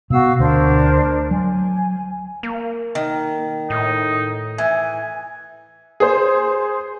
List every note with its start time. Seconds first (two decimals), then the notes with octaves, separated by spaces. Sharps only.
0.10 B2 B3 F#4 F5 E6
0.39 D2 D4 A#4 C5
1.31 F#3 G#5
2.43 A#3
2.95 D#3
3.70 A2 D#4
4.58 E3 G#5
6.00 G#4 C5